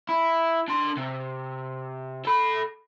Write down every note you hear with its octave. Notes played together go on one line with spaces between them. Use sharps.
E4
D4 C6
C3
A4 B5